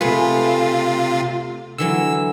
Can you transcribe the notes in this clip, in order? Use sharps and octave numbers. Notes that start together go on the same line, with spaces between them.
C3 A3 F4 G#4 B4
D3 E3 F#3 E6